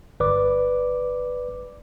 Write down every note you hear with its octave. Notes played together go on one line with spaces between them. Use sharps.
G1 B4 D5 D6